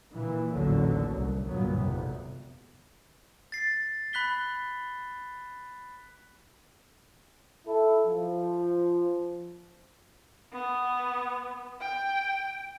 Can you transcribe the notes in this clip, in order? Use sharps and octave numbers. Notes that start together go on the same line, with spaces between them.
A#2 E3
A1 D#2 D3 F#3
C2
G1 A#2 F#3 B3
G#1 F2 C3
A6 C7
B5 F#6 B6 G7
E4 A4
F3
B3
G5